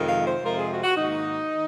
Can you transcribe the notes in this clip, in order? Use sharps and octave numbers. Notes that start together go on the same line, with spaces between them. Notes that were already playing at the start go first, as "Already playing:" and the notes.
Already playing: F2 C3 D#3 G#3
F5
C5
F2 C3 F3 G#3 A#4
G#4
F#4
F#4
G#2 D#3 A#3 D#4
D#3